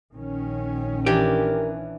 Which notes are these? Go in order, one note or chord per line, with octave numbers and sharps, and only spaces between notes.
A#1 D#3 C#4
E3 D4 G4 A#4